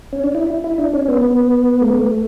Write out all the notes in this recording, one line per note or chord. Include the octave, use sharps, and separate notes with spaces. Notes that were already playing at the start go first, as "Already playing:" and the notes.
C#4
D4
E4
E4
D4
C#4
B3
B3
A3
B3
A3